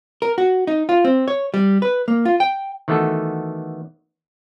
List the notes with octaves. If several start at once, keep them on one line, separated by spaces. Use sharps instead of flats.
A#4
F#4
D#4
F4
C4
C#5
G3
B4
A#3
F4
G5
D#3 E3 A3 B3 F#4 A4